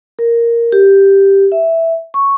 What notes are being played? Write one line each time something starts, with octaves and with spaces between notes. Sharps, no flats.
A#4
G4
E5
C#6